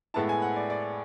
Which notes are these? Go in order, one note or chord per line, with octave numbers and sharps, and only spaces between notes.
A2 G#3 B3 E4 A5
G#5
F#5
D5
D5